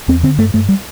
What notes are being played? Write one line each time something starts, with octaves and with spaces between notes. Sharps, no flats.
E2 C4
D3 C4
G2 A3
G2 A3
G3